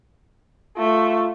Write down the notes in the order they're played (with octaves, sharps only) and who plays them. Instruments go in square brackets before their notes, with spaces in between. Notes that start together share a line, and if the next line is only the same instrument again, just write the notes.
[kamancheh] A3 [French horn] F4